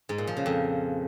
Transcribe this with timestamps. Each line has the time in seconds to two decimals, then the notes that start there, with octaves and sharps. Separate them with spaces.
0.09 G#2
0.18 A#2
0.27 F3
0.37 C#3
0.46 F2